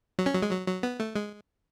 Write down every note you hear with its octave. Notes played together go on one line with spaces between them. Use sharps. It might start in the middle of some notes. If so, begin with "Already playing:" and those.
F#3
C#4
F#3
G#3
F#3
F#3
B3
A3
G#3